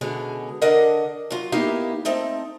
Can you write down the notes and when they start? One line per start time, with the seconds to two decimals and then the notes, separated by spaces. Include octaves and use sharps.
0.01 B2 D3 G#3 C#4
0.62 D3 D4 A#4 D#5 F#5
1.30 F#3 F4
1.52 A#3 B3 D#4 E4 G4 F5
2.05 A3 C4 D#4 A4